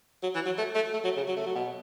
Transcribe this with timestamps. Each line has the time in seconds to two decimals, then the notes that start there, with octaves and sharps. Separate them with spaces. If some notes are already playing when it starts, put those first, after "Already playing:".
0.22 F#3
0.34 E3
0.46 F#3
0.58 A3
0.75 A3
0.93 A3
1.04 F#3
1.16 C#3
1.28 F#3
1.37 A3
1.46 F#3
1.55 B2